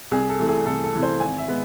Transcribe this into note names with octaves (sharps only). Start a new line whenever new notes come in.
C2 G#4
A4
C3 E3 A3
G#4
C2 A4
A4
C3 E3 A3
C5
G#1 G#5
E5
G#3 B3